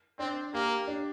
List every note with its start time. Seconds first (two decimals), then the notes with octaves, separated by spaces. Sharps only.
0.19 C4 D4
0.54 A#3 G4
0.87 D4